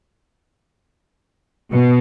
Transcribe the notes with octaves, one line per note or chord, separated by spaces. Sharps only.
B2